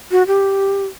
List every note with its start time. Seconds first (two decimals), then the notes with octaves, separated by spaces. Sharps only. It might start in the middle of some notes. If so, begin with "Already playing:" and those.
0.11 F#4
0.27 G4